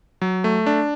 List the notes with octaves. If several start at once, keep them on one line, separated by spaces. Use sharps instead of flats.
F#3
A3
D4